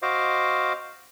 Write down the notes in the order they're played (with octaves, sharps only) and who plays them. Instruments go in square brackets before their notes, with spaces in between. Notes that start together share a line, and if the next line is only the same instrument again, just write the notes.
[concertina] F#4 C5 D#5 F5 D6